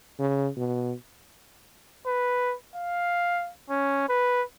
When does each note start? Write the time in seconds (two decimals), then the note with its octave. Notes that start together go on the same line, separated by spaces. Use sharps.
0.19 C#3
0.57 B2
2.06 B4
2.76 F5
3.70 C#4
4.09 B4